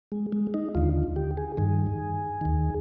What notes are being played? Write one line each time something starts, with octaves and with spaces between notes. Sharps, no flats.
G#3
G#3
D#4
D#2 D3 F4
G4
G#4
G2 D#3 G#4
D#2 D#3